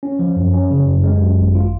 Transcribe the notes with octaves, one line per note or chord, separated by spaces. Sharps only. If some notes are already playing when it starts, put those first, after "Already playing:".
C#4
F3
F#2
C#4
C#3
F#2
G#3
F#2
G#1
F4